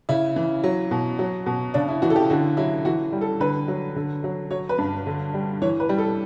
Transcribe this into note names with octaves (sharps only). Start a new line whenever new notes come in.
C#3 E4
E3
F#3
B2
F#3
B2
C#3 D4
E4
E3 F#4
A4
G4
D3 F#4
F#3 E4
E3 F#4
G3
A4
D3 B4
F#3
D3
F#3
F#3 C#5
B4
G2
D3
G3
E3 C#5
B4
G3
A4